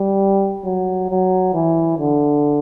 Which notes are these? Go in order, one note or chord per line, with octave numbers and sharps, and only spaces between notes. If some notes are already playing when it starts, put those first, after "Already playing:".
Already playing: G3
F#3
F#3
E3
D3